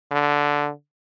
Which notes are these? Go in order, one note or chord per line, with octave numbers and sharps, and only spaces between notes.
D3